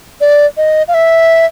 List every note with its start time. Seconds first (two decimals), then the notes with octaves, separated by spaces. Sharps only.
0.21 D5
0.57 D#5
0.88 F5
0.94 E5